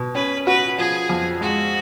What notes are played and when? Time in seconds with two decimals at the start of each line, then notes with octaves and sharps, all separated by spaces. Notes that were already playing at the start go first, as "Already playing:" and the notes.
Already playing: B2
0.15 C#4 B4
0.47 F#4 B4
0.78 F3 G#4
1.09 F2
1.41 G#3 F#4